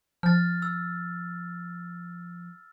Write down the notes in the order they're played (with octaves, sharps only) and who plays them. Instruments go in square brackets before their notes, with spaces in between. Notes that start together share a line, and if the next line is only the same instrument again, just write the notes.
[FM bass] F3 [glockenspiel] F6 A6
[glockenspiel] E6